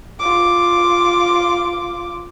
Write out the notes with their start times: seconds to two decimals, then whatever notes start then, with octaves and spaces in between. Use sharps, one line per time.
0.19 F4 D6